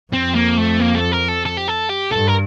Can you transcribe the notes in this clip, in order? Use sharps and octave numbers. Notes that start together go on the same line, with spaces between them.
F2 C4
A#3
A3
A#3
A4
A#4
A4
A4
G4
A4
G4
G2 A4
A#4